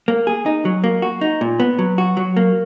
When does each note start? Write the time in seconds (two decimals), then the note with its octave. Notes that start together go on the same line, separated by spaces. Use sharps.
0.08 A#3
0.27 G#4
0.46 D#4
0.65 F#3
0.84 A#3
1.02 F#4
1.21 D#4
1.41 A#2
1.60 B3
1.79 F#3
1.98 F#4
2.17 F#3
2.37 A#3